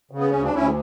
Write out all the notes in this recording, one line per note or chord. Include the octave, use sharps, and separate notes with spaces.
C#3
B3
D2 C#4
D4
D2 C#4 E4